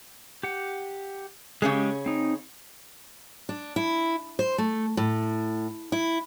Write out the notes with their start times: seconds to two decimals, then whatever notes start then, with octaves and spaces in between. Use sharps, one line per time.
0.43 G4 F#5
1.62 C#3 G#3 C#4 G4 G#4
2.06 C4 D#4
3.49 D4
3.76 E4
4.39 C5
4.58 A3
4.97 A2
5.92 E4